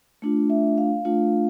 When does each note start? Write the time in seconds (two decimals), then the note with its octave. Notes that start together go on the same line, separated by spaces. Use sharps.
0.22 A3 D4 F4
0.50 E5
0.78 F5
1.05 A3 D4 F4